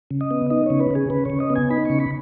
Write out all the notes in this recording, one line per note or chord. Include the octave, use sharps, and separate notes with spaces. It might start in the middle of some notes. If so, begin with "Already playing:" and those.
C#3
D#5
B3
D#4 D#5
C#3 C#5
B4
C#3 G#4
C#3 B4
C#3 C#5
D#5
B3
G#5
D#4 B5
C#3 C#6
B5